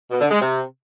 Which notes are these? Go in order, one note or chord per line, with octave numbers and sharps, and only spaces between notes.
B2
D3
G#3
C3